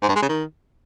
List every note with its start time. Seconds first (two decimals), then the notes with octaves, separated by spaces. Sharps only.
0.02 G#2
0.09 G2
0.16 G#3
0.22 C#3
0.29 D#3